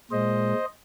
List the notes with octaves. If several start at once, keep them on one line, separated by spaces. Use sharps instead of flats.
A#2 G#3 C5 D#5